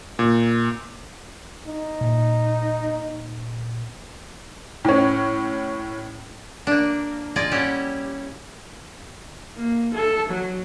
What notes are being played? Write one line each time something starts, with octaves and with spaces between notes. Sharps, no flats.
A#2
D#4
A#2
A2 C#4
A#3 D4
F4 G#4 D5 D#5
G3 C#4 E4 F#4 G4
A#3
A4
F#3